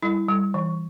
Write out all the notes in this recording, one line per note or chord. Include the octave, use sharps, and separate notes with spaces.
G3 E4
G3
E3